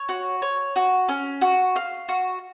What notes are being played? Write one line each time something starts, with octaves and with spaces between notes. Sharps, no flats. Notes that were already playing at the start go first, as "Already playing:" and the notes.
Already playing: C#5
F#4
C#5
F#4
C#4
F#4
F5
F#4